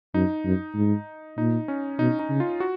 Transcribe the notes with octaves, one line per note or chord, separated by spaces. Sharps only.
F#2 D#4
F#2
G#2
A#2 D#4
C#4
B2 D#4
D#4
C#3
F4
F#4